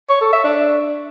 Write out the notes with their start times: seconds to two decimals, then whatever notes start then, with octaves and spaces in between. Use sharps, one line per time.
0.10 C#5
0.21 A4
0.33 E5
0.44 D4